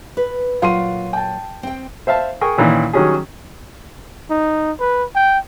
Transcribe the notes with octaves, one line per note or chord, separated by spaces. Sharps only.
B4
A#2 F#3 F4 C6 D#7
G5 A5
C4 G5
C5 E5 F5 A5
G#4 A#4 G5 C#6
A#2 D#3 E3 C#4
D#3 F#3 G3 C#4 F#4 G#4
D#4
B4
G5